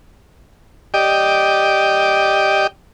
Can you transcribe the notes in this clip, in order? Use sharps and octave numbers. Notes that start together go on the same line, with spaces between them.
G4 D5 D#5 G5